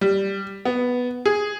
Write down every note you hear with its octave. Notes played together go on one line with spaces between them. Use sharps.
G3
B3
G#4